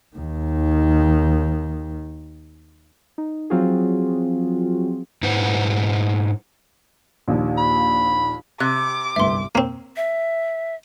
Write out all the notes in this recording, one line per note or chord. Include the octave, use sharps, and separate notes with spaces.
D#2 D#3
D#4
F3 F#3 C4 F4 F#4 G#4
G#2 E4 B4 C5 F#5
A#1 D#2
B5
C3 D6 F#6
G1 C2 E5 C6
A#3 C4
E5